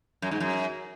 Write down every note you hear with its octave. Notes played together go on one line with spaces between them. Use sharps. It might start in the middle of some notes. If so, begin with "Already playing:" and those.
F#2
G#2
F#2